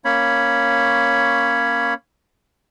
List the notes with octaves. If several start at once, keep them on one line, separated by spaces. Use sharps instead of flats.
A#3 C#4 C#5 B5